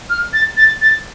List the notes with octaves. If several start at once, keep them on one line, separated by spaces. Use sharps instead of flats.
F6
A6
A6
A6